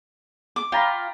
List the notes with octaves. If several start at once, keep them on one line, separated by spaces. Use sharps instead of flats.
D6
F4 G5 A#5 B5